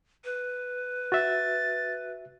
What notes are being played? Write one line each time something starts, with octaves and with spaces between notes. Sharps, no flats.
B4
F#4 E5 A6